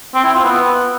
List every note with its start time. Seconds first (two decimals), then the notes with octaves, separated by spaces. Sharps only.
0.14 C4
0.24 E4
0.34 F4
0.44 B3